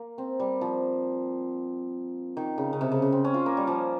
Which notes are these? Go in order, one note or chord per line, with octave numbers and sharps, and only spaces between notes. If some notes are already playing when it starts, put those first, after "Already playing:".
Already playing: A#3
C4
G3
F3
D#3
C#3
C#3
C3
C#3
C#3
C4
C#4
F4
A#3
G3
F3